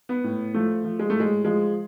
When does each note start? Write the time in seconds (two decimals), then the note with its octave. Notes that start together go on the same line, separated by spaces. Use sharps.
0.09 B3
0.24 A2
0.54 F3 A3
0.84 F3
0.99 G#3
1.10 A3
1.15 A2
1.20 G#3
1.45 F3 G#3